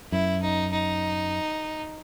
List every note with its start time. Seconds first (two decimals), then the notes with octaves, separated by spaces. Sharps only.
0.12 F#2 E4
0.42 D#4
0.72 D#4